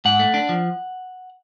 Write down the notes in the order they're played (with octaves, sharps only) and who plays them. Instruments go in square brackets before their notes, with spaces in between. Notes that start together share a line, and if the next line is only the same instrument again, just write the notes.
[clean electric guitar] G#2 F#5
A3
D4
F3